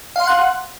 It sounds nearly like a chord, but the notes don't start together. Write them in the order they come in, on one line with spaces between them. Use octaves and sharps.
F5 C6 F#5 F#6